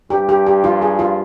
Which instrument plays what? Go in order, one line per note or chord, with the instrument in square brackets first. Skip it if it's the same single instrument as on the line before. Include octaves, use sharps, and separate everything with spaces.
[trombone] G2 [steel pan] G4
[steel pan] G4
G4
F4
G#4
F4